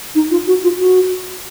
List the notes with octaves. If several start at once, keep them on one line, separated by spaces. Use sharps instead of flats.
D#4
F4
F#4
F4
F#4